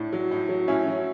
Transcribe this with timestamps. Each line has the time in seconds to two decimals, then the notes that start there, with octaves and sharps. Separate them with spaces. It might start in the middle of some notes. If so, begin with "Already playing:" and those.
Already playing: A2 D4
0.12 F#3
0.31 A2
0.49 F#3
0.67 A2 C#4 E4
0.87 F#3